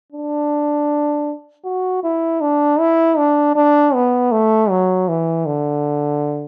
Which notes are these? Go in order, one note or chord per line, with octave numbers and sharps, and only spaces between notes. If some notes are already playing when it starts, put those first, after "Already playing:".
D4
F#4
E4
D4
E4
D4
D4
B3
A3
F#3
E3
D3